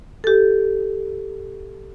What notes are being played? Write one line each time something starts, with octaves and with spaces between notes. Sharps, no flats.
G4 A4